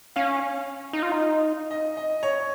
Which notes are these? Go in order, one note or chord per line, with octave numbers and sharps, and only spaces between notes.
C#4 F5
D#4
F4
D#4
D#5
D#5
C#5